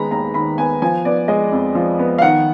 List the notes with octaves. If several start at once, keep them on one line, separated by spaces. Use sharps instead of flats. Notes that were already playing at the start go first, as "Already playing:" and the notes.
Already playing: D#3 G#3 B3 A#5 B5
D#2 A#5
D#3 B5
B3 G#5
F3 G#5
B3 D5
G#3 D#5
F2
F3
B3
F5
D#3 F#5